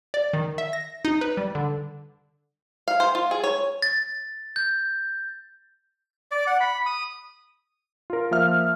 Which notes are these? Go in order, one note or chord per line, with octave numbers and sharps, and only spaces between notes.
D5
D#3
E5
A#6
D#4
B4
G3
D3
F5
C5
F4
G#4
C#5
A6
G6
D5
F#5
B5
D#6
F4 A#4
F3 A#3 E5 F6